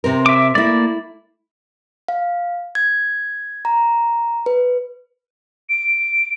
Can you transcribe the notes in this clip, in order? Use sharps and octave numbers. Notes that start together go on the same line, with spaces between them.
C3 C4 A#4
E5 D6
A3 A#3 E4 D5
F5
G#6
A#5
B4
D7